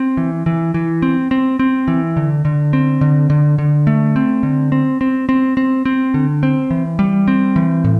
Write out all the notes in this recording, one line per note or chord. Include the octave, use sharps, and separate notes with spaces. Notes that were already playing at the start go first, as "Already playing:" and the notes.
Already playing: C4
E3
E3
E3
C4
C4
C4
E3
D3
D3
C4
D3
D3
D3
A3
C4
D3
C4
C4
C4
C4
C4
D3
C4
E3
G3
C4
E3
A2